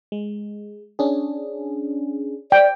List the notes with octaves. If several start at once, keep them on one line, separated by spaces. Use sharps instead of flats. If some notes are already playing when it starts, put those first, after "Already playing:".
G#3
C#4 D4 G#4
D5 G5